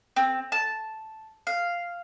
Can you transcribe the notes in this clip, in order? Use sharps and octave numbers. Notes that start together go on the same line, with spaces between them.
C4
A5
F5